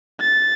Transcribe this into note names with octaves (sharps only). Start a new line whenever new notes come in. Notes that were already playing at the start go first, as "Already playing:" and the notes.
A6